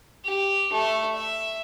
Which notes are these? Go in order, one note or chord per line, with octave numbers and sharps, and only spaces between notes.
G4
A3 E5
E5